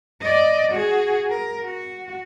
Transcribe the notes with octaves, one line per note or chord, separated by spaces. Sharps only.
D5 D#5
F#4 G#4
A#4
F#4